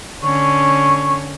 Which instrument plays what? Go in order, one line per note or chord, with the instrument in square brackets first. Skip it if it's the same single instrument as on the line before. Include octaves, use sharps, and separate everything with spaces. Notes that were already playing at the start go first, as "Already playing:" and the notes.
[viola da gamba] D3 C#4 [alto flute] C#6